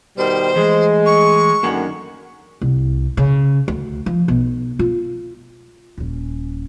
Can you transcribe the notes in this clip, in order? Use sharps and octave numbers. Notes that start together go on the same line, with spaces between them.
B2 D#3 G3 C5
E3 G#3 A3 G#4
C#6
F#2 D3 D#3 A#3 F#5
C2
C#3
D2
F3
B1
F4
D#1 C#4